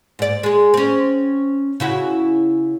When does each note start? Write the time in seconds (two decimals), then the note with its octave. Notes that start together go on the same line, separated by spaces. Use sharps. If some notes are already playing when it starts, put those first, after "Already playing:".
0.19 G#2 D5
0.43 G#3 G#4
0.74 C4 C#4
1.80 C#3 E4 F#4